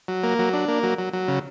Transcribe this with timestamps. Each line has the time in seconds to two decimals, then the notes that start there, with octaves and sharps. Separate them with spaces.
0.08 F#3
0.23 A#3
0.39 F#3
0.53 D4
0.68 A#3
0.83 F#3
0.98 F#3
1.13 F#3
1.28 C#3